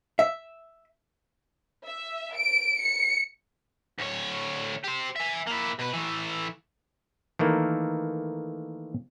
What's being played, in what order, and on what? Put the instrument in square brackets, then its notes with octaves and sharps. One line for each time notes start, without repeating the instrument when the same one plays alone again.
[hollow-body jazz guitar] E5
[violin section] E5
D7
C#7
[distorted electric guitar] D2 C#5
G4 C5
E5 G#5
A#3 E4
B2 B4
E3 A3
[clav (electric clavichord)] D#3 E3 A3 A#3